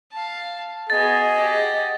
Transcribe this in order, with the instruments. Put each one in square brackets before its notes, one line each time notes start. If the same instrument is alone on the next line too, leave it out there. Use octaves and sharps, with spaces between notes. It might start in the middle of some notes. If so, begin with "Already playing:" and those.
[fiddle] F5 A5
[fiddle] B3 F#4 [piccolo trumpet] G#4 [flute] D#5 [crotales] A6
[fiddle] G4 F#5